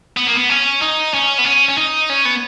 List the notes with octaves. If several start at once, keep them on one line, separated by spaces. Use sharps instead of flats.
B3
A#3
B3
C#4
D#4
C#4
B3
C#4
C#4
D#4
C#4
B3